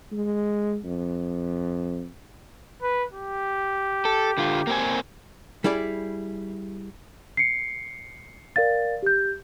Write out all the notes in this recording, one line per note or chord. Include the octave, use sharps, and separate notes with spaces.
G#3
F2
B4
G4
A4
D3 F4
A#3 C4 G#5
G3 E4 G#4 D5
C7 C#7
A#4 D5 F5 A6
G4 G6